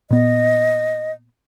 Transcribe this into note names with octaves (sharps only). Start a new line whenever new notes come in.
A#2 B3 D#5